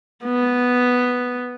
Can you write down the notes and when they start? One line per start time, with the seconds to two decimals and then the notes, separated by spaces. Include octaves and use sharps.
0.25 B3